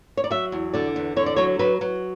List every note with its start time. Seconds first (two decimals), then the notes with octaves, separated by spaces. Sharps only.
0.17 C#5
0.24 D5
0.31 F#3 E5
0.52 E2
0.74 D3 D5
0.96 E2
1.16 D3 C#5
1.26 D5
1.36 F#3 C#5
1.59 F#3 B4
1.81 F#3